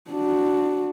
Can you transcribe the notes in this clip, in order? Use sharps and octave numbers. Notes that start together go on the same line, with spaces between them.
D4 F#4